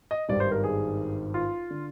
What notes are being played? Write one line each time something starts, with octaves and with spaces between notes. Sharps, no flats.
D#5
G#1 G2 D#3 G3 D5
C5
A#4
G#4
F4
D3